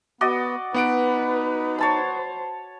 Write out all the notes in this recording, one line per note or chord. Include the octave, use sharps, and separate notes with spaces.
B3 F#4 D5 D#5
B3 D#4 B4 F#5 D7
C5 C#5 A5 B5